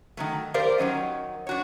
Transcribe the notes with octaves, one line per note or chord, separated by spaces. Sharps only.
D#3 F#3 A3
G4 A#4 C5 D5 F5
D#3 F#3 C#4 D#5
D4 F#4 C#5